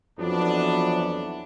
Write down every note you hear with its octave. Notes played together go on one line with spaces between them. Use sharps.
F2 E3 F#3 B3 D4